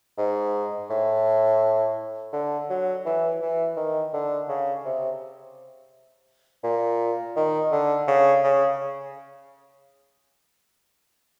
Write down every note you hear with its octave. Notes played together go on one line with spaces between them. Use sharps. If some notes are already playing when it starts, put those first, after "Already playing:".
G#2
A2
D3
F#3
E3
E3
D#3
D3
C#3
C3
A#2
D#3
D3
C#3
C#3